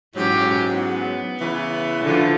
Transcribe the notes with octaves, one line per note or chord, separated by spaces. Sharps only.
G#2 E3 F#3 C#4 G4
B3
C#3 E3
D3 F3 F4